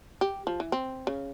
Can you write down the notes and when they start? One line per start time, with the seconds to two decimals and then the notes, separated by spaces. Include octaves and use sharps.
0.21 G4
0.47 F3
0.60 E3
0.72 C4
1.07 C#3